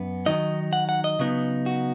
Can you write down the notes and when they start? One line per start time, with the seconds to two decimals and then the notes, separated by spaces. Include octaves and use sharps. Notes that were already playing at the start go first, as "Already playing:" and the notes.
Already playing: F#2 B3
0.26 D#3 F#3 D#4 D#5
0.73 F#5
0.89 F#5
1.04 D#5
1.19 C#3 F#3 B3 D#4
1.66 F#4